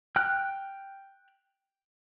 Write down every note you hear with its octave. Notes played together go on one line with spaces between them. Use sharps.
G5 F6 F#6